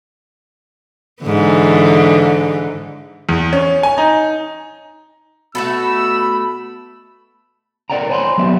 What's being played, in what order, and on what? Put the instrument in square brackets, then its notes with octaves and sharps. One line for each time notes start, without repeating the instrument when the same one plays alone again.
[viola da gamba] G#2 D3 E3
[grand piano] E2
C#4
G#5
D#4
[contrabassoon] B2 [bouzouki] A3 F#4 A4 [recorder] B5 [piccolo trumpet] E6
[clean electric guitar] A#4 B4 D5 F#5 G5 A#5
C5 C#5 G#5 A5 B5 C6
F#3 G3 B3 E5